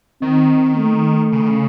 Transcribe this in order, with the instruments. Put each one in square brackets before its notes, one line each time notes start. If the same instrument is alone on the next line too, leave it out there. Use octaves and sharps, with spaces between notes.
[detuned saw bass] D#3 [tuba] C4
[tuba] A3
[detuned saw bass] C#3
D#3
C#3